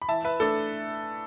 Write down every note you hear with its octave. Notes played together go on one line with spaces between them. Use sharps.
B5
E3 E5 A5
B4 E5
A3 D4 A4